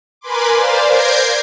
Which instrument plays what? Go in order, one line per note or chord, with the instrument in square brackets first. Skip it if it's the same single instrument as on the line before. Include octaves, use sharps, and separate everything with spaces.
[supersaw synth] A#4 B4 G#5 B5 C6 D6
C5 D5 F5
G6 G#6 A#6 C7 D7